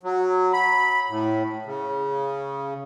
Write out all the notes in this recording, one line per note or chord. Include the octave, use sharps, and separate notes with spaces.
F#3
B5
A2
C#3